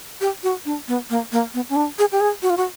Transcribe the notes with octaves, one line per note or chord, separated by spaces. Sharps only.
G4
F#4
D4
B3
A#3
A#3
B3
C#4
D4
G#4
G4
G#4
F#4
F4
F#4